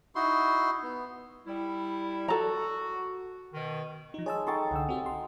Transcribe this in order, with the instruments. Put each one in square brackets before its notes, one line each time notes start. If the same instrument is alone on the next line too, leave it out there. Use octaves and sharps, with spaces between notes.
[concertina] D#4 E4 F#4 C6
B3
[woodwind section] G3 E4
[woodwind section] F#4 [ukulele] A4 A#5
[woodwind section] B2 D#3
[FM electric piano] F3 D#4
[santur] G#3 [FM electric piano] C#5 A5 E6
[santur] D#4 A4 G5 [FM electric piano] C6 C#6 A6
[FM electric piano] C2 D3 E6 [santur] F#5
[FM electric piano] C4 F#4 G4
C6